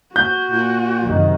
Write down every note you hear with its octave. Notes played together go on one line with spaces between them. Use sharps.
F#4 G6
A#2
F#2 C3 D#3